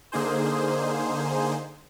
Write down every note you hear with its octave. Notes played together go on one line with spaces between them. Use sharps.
D3 A#3 D#4 G#4 C5